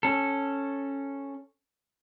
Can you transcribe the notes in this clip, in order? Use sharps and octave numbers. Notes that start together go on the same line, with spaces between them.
C#4 A4